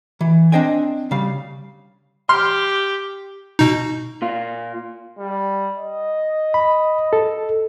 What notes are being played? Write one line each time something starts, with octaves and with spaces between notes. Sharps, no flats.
E3
C4 D4 C5 D#5 G5 G#5
C#3 G3 F5
G4 C6 F6
B2 D#4
A#2 F4
G3
D#5
B5
A4